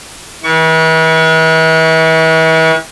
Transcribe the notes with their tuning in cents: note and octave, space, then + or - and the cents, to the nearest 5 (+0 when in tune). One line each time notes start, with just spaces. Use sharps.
E3 -40 C#6 +20